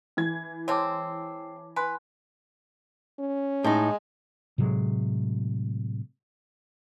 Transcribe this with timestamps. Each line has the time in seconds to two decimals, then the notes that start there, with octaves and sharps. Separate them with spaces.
0.17 E3 G#6
0.68 G#3 C4 C#5 A5 D6
1.76 B4 G#5 C6 F#6
3.19 C#4
3.64 A2 G#3 D#4
4.58 A2 C3 F#3 G#3